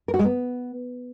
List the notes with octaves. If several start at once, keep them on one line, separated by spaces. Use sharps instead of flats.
A#4
F#4
G#3
B3